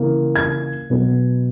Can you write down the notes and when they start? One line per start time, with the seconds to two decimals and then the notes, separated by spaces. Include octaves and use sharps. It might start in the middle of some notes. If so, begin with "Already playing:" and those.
Already playing: C#3 E3 A#3
0.36 G#6
0.90 B2 F#3 B3